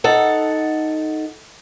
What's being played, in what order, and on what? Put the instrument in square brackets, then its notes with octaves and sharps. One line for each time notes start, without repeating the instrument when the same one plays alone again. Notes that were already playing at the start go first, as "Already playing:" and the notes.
[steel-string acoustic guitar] D#4 A4 F#5